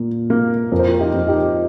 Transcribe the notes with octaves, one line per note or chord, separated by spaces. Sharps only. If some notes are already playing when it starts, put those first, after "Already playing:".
Already playing: A#2 A#3
A#3
F2 A#4
C5
F4 A#4
D#4 G4
F2 F4
D#4 G4